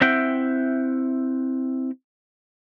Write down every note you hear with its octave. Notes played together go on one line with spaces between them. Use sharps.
C4 E4 E5 F#5 G5